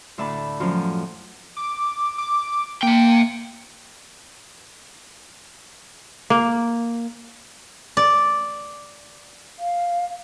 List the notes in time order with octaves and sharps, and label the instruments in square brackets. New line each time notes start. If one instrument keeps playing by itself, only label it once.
[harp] D2 A2 D4 E5 A5 B5
F#2 F3 F#3 C#4 F4
[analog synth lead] D6
D6
[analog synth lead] A#3 [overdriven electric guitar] E5 G5
[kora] A#3
[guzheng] D5
[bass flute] F5